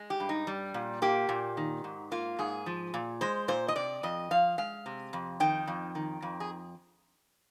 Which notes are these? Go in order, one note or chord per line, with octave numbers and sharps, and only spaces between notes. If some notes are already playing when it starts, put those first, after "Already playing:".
Already playing: G#3
G4
G2
D#4
G3
A#2
A#3 G4
A#2
D#3
G#2
A#3 F4
G#2 G#4
F3
A#2
G#3 C5
A#2 C5
D#5
C3 D5
F2 D#5
F3 F5
G#3 F5
C3
F2
D#3 G5
F2
D#3
F2
G#4